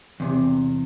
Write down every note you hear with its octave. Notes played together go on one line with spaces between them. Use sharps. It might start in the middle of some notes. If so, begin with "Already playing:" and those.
E2 C3